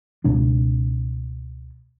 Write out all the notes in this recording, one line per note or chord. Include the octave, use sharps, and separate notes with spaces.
C#2 B2 G#3 D4